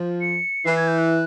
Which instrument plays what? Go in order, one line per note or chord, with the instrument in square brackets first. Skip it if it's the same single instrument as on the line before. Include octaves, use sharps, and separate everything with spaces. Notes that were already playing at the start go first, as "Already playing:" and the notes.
Already playing: [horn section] F3
[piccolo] C#7
[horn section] E3 [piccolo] C7
[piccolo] G#6
G6
F#6